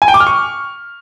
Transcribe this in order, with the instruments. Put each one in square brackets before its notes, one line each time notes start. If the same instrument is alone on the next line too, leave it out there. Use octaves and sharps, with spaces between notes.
[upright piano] G#5
G5
D6
F6
C#6